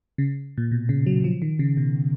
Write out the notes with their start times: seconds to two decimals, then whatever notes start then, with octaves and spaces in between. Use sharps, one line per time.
0.18 C#3
0.58 A#2
0.72 B2
0.89 C#3
1.06 F#3
1.24 F3
1.42 D#3
1.59 C#3
1.77 B2